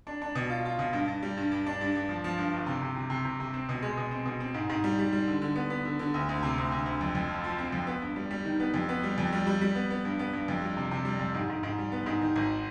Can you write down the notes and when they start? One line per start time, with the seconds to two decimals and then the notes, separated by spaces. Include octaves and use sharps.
0.07 D4
0.22 D4
0.35 B2
0.50 F4
0.65 F4
0.79 B2
0.93 G2
1.08 G2
1.23 G3
1.37 G2
1.52 G2
1.66 D4
1.81 G2
1.95 G2
2.09 F3
2.24 F3
2.38 G2
2.53 G1
2.66 C3
2.82 C3
2.96 C3
3.10 C3
3.25 C3
3.40 C3
3.54 C4
3.69 B2
3.82 G#3
3.97 B2
4.11 C4
4.25 B2
4.40 C4
4.54 G#2
4.69 G#2
4.84 G3
4.99 G3
5.13 G3
5.27 D3
5.42 D3
5.56 B3
5.70 B3
5.85 D3
5.99 D3
6.14 D2
6.29 D2
6.43 C3
6.58 D2
6.72 D2
6.86 D2
7.01 F2
7.15 F2
7.29 F3
7.44 F3
7.58 C4
7.72 F2
7.87 B3
8.02 G2
8.16 G3
8.31 G3
8.45 D#3
8.60 B3
8.74 F2
8.89 B3
9.03 G3
9.18 F2
9.33 G3
9.47 G3
9.61 G3
9.75 B3
9.90 B3
10.05 G2
10.19 B3
10.33 G2
10.48 F2
10.62 G3
10.77 C3
10.91 C3
11.05 G3
11.19 F2
11.34 G#2
11.49 G#2
11.63 G#2
11.78 G3
11.92 B3
12.06 G#2
12.21 D#3
12.36 G#1